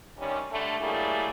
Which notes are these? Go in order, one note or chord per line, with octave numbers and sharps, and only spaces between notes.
C3 D#3 G3 C#4
D3 G3 A3
F#3 G3 A3 A#3 E4 G#4